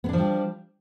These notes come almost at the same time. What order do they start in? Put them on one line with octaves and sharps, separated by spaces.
B3 D4 F3 G3